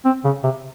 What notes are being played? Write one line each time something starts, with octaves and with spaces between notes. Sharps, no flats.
C4
C#3
C3